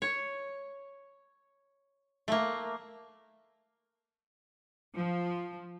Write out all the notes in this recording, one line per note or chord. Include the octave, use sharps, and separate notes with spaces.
C#5
A3 A#3
F3